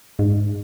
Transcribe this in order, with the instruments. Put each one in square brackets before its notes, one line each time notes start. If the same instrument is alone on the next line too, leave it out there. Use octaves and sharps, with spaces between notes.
[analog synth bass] G#2